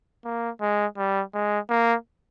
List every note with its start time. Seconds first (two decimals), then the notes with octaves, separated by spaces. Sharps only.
0.25 A#3
0.61 G#3
0.97 G3
1.34 G#3
1.69 A#3